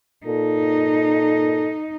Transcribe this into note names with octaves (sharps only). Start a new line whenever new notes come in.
A#2 D#4 A4